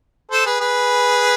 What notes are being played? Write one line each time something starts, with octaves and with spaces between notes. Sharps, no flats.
A4 C5
G#4 B4
G#4 B4